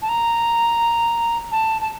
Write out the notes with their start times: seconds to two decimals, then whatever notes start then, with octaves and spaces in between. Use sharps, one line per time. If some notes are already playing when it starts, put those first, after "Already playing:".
0.02 A5
0.09 A#5
1.52 A5
1.82 A5